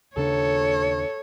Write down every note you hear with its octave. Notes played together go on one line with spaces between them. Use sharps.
D#2 C#3 D4 A4 C#5